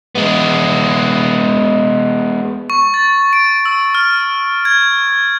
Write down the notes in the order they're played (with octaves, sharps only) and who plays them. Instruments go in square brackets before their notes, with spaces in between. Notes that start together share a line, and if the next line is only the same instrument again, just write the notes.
[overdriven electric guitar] G#3 B3
[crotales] C#6
A6
D7
E6
F6
G#6